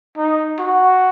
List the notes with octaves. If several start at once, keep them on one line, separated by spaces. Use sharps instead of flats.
D#4
F#4